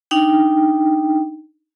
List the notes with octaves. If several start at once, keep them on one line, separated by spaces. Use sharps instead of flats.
D4 D#4 G5